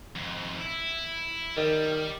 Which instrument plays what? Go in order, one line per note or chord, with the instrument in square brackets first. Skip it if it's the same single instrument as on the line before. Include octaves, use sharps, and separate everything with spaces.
[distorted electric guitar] F2 G#2
E4
[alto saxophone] D#3 [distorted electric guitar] G3